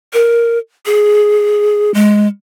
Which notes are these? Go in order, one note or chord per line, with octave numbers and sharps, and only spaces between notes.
A#4
G#4
G#3